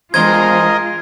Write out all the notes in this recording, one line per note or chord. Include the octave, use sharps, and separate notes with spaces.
E2 G2 G#3 F4 A#4 C5 D#5 G#6